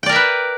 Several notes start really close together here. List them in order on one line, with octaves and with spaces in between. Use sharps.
G5 D5 A#4 E5 B4